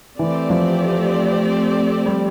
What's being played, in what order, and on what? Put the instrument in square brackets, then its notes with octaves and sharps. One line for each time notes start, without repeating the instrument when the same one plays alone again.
[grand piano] E3 [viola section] A3 C4 G4 D5
[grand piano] F3
G3